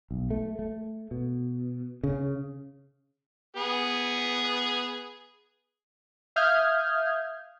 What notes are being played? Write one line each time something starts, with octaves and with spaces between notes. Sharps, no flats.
B1
A3
A3
B2
C#3
B3 G#4
E5 F5 D#6 F6 G6 G#6